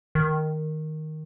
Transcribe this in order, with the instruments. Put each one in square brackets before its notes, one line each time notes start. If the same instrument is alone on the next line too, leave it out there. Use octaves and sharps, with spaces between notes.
[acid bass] D#3